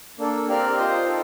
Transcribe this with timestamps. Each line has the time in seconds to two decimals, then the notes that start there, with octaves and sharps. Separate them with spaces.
0.18 A#3 D4 A4
0.48 C4 G4 A#4 D5 F5
0.78 F4 C5 D#5 G5
1.07 D#4 A4